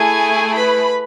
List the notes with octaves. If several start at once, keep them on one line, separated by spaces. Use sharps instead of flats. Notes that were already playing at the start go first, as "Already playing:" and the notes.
Already playing: A3 E4 G#4 G#5
B4 B5